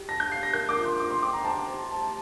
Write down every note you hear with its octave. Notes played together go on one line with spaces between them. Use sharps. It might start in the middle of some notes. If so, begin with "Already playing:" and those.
Already playing: G4
A5 A#6
G6
F5 C7
A#6
A#4 G6
D6
F4
C6
G4 D6
C6
G5 D6
A#5
C5 A5
G4
A5